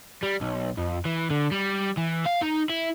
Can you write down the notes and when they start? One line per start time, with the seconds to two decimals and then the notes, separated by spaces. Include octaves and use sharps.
0.23 G3
0.41 B1
0.77 F2
1.05 E3
1.30 D3
1.52 G3
1.97 E3
2.26 F5
2.42 D#4
2.70 E4